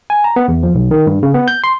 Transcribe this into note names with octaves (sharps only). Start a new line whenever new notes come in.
G#5
A#5
B3
E2
F3
B1
D#3
G2
C#3
B3
G6
C6